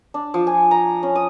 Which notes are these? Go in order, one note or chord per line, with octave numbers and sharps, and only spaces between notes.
D4
F3
G#5
A#5
C#4
D#6